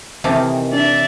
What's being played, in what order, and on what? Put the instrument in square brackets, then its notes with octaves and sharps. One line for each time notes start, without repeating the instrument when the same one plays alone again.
[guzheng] C3 E3 [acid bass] D#3 [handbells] E5 A5 D6
[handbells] D4 [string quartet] D5 E5